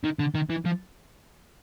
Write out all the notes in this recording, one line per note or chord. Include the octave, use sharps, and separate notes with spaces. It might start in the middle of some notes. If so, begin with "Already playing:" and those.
D#3
D3
D#3
E3
F3